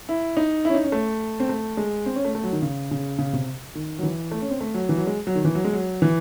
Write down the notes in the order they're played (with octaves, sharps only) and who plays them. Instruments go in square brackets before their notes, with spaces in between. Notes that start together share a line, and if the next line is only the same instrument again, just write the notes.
[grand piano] E4
D#4
C#4 E4
D#4
C#4
A3
C4
A3
G#3
C4
C#4
A3
A3
F#3
D#3
C#3
C#3
C#3
C3
D#3
F#3
E3
A3
C#4
C4
A3
F#3
E3
F#3
G#3
F#3
D#3
E3
F#3
G#3
F#3
E3